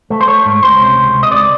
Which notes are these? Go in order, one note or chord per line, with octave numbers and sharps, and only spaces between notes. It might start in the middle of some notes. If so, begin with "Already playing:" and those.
A3
C5
A3 C#5
G#2
C#2 C5
C3
C#2
C#2
D#5
C#2 D5